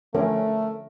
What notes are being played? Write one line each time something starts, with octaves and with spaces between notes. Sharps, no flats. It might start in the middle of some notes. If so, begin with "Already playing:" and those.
D3 F3 A3 C#4 A#4